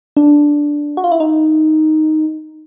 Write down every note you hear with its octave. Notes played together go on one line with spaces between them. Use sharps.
D4
F#4
F4
E4
D#4